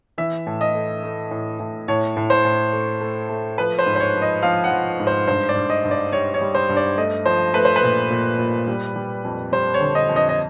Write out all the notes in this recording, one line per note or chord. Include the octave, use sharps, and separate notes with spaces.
E3 E5
A2
D#5
A3
A3
A2
A2
A2 C#5
A2
C5
A2
A3
A3
A3
F3 B4
C5
G#2
C5
C#5
F3
D#5
F3 F5
F#5
F3
G#2
C5
G2 C5
D5
G2
D#5
G2
D5
G3 C#5
C#5
G3
C5
G2
D5
A3 D#5
F3 C5
A3 B4
C5
B4
A#2
A#2
A#2
G3
G3
F2
G3 C5
C#5
D3
D#5
F2
D#5
D#5